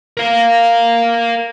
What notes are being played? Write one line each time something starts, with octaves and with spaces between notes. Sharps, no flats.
A#4 F5